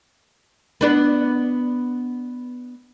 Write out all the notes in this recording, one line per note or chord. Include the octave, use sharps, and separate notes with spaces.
B3 D4 B4